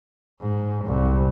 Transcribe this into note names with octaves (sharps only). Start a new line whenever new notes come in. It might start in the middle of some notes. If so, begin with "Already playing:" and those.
G#2
C2